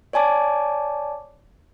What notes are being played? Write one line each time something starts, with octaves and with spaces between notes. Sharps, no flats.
C#5 D5 G#5 A5 D6